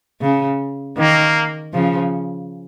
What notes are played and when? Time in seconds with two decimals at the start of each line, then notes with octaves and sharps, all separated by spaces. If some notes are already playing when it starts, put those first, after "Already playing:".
0.22 C#3
0.98 D#3 A#3
1.74 C#3 F3